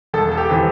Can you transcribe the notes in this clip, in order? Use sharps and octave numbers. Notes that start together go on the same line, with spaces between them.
E1 A4
A4
G4
C3 E3